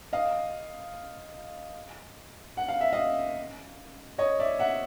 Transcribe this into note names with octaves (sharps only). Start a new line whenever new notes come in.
D#5 F5
F#5
F5
E5
D#5 F5
C#5 D#5
D5 E5
E5 F#5